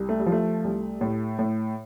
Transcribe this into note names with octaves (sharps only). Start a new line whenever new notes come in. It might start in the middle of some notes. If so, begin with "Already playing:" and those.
Already playing: C2
A3
G3
F3
A3
C2
A2
A2